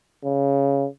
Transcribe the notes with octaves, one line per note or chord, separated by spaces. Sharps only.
C#3